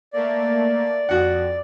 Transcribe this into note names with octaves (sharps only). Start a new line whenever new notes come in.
A3 A#3 D5
F2 F#4 F#5